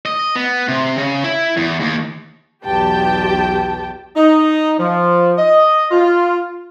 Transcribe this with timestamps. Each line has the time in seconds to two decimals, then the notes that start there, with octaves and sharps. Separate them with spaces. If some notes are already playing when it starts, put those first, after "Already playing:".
0.06 D#5
0.36 B3
0.68 C3
0.98 C#3
1.24 E4
1.57 E2
1.80 D#2
2.65 B1 E2 G4 G5 A5
4.17 D#4
4.79 F3
5.38 D#5
5.91 F4